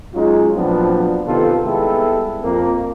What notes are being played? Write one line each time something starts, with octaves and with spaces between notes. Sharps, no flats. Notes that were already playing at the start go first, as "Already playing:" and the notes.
F#3 G#3 C#4 D#4 F4
A#2 F3 F#3 B3 C4 D4
C3 D#3 B3 F4 A4
G3 G#3 B3 E4 G4 A4
F2 A#3